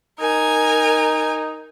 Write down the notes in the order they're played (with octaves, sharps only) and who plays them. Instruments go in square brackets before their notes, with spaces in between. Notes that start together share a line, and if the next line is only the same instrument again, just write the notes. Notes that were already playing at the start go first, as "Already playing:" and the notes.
[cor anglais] D#4 [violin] A#4 G#5